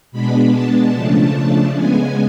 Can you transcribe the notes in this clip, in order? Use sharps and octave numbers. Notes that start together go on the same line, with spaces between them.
B2 G#3 B3 D4 B5
A5
C#3 F3 A3 D4
C#3 G#3 B3 G#5